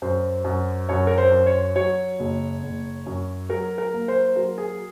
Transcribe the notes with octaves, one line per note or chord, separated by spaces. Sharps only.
F#2 C5
F#2
F#2 C#5
A#4
C5
F#2
C#5
F#3 C#5
F#1
F#1
F#2
F#3 A#4
A#4
A#3
C5
F#3 A#4
G#4